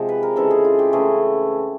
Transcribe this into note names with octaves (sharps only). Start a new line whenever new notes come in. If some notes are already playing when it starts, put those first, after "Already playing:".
Already playing: C3 F3 G#3
B4
A#4
C#3 E3 G#3 A4
G#4
F4
G4
C#3 E3 A3 G#4